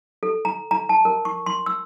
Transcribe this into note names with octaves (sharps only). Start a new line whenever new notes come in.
A4
A#5
A#5
A5
A#4
C#6
C6
E6